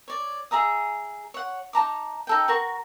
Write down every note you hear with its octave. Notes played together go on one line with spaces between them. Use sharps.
C#5 D5
G#4 E5 A#5 D#6
C#5 F#5
D#4 A5 A#5 D6
D#4 A4 G5
F#4 A#4 C#6